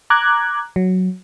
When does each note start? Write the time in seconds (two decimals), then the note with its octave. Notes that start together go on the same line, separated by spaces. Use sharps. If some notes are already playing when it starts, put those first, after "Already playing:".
0.10 A#5 D6 F#6 G#6
0.76 F#3